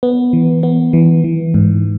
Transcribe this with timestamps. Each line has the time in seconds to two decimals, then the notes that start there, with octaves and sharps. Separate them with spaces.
0.03 B3
0.33 E3
0.63 B3
0.93 E3
1.24 E3
1.54 G#2